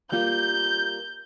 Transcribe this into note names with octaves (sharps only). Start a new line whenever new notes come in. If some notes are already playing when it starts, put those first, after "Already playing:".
G3 A#3 F4 G6